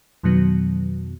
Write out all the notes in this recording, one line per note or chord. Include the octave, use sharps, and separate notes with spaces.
F2 B2 D#3 F#3 B3